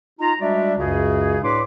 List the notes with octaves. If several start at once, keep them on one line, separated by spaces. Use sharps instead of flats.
D#4 F4 A#5
G3 G#3 D4 F#4 D5 E5
C#2 F#2 C#3 F#4 G#4
A2 D4 B4 C6 D6